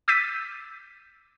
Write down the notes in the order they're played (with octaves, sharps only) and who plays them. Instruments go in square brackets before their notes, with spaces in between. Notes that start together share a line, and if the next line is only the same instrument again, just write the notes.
[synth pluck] D6 E6 G6 A6 B6 D#7